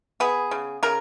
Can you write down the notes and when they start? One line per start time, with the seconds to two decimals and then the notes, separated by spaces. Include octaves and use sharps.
0.20 B3 G#4
0.51 C#3
0.83 C#3 A#4